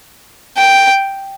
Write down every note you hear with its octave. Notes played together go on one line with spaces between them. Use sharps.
G5